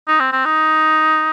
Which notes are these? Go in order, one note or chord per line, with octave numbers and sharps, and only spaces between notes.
D#4
C4
C4
D#4